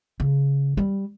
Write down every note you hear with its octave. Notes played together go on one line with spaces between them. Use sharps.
C#3
G3